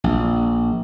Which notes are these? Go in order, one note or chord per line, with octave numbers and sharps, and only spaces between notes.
A#1